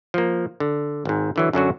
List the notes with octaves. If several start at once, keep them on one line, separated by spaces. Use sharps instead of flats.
F3 A#3
D3
G#1 G#2
D3 E3 F#3
F#2 D3 F#3 F#4